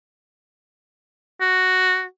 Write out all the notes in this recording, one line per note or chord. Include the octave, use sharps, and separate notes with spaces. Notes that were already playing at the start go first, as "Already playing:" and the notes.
F#4